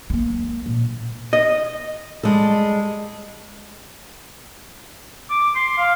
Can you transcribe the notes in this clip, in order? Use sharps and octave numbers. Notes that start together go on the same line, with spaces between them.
G#3 A#3
A#2
D#5
G3 G#3 A4
D6
C6
F5